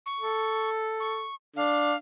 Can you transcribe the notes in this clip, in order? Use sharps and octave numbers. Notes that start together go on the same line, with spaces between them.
C#6
A4
C#6
D4 F5